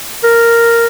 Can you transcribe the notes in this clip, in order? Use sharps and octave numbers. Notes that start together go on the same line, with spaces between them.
A#4